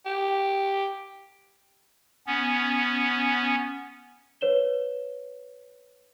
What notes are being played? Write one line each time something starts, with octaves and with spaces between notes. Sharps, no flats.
G4
B3 C#4
B4 C#5 E7 G7